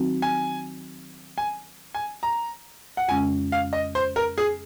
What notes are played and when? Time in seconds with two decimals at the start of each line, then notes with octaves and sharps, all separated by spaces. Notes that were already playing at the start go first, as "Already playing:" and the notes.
Already playing: D#3 F#3 C4 D#4 F#4
0.22 G#5
1.38 G#5
1.94 G#5
2.23 A#5
2.97 F#5
3.08 F2 C#3 G#3 C#4 G#5
3.52 F5
3.73 D#5
3.95 C5
4.16 A#4
4.38 G#4